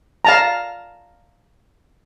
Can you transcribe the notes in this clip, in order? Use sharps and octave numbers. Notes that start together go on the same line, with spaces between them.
F5 A5 A#5